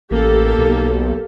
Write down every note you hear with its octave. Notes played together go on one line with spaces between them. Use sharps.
A1 A#3 G4 A4
B1